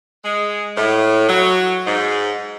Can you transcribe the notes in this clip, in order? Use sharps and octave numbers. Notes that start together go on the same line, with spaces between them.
G#3
A2
F#3
G#2